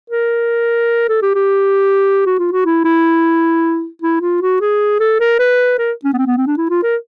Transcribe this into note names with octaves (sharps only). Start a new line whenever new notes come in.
A#4
A4
G4
G4
F#4
F4
F#4
E4
E4
E4
F4
F#4
G#4
A4
A#4
B4
A#4
C#4
B3
C4
B3
C4
D4
E4
F4
A#4